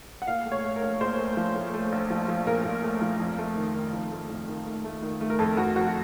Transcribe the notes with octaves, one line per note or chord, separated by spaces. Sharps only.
F#5
A#2 F5
A3
C#5
A3
A#4
A#1
A#2 C5
A3
F3
A3
A3
A#1
F3
F3
A#2 A#4
A#2
A3
F3
F2
A3
D#3
D#3
F2
A3
F2
D#3
A3
A3
D#3
A3
A#4
F2 A4
F2 F#4
F2 F#4
F#4